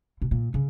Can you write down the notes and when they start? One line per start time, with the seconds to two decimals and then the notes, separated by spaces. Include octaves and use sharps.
0.22 B2
0.31 A#2
0.54 C#3